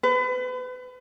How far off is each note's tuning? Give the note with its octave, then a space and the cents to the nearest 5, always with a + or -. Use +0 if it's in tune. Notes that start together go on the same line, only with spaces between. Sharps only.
B4 +35